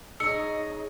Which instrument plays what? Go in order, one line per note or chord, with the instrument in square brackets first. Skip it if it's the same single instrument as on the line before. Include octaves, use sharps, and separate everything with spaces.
[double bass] D#4 [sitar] G#4 C#5 [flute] D#5 [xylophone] E6 C#7